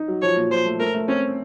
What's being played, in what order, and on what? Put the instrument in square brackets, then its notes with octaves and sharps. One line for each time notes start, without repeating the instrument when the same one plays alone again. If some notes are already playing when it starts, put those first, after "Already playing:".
Already playing: [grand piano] D#4
F#3
[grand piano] F3 [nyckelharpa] C#5
[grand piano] A#2
[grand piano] F3 [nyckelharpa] C5
[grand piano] A3
[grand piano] A3 [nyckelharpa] A#4
[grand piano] A3
[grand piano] C4 [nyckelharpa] C#4